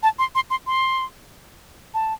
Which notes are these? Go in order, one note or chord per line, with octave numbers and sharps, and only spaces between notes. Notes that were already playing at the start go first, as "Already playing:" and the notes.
A5
C6
C6
C6
C6
A5